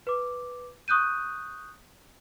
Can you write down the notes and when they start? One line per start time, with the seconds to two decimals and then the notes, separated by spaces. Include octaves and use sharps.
0.07 B4 D6
0.88 C#6 D#6 F#6 G6 D#7